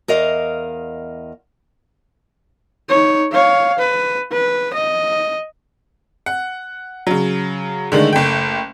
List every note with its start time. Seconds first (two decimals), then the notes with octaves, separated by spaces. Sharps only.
0.08 E2 A#4 D#5 F5
2.89 D#4 C#5
3.32 C#5 F5
3.79 B4
4.32 B4
4.74 D#5
6.26 F#5
7.07 C#3 F#3
7.92 D3 D#3 G#3 A3
8.12 F#1 A3 G5